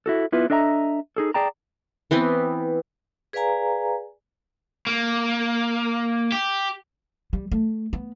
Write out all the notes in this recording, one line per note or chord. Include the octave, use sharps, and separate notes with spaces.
E4 F#4 A4
B3 E4 F4 B4
D4 A4 D#5 E5 G5 A#5
D#4 G#4 A4
G#4 D5 G5 A5 A#5
E3 B3 C4
G#4 B4 D5 F5 G#5 A#5
A#3
G4
G3
A3
B3